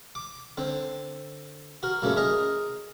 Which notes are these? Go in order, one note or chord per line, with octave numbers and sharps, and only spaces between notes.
D6
D3 C4
F#4 A#4
F#2 A#2 C#3 A3
G#4 A#4 D#5 A#5